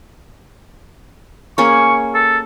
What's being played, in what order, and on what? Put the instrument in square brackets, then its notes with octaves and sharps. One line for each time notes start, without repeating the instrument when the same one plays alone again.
[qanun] A#3 C#4 G#4 [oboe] C#6
[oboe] A4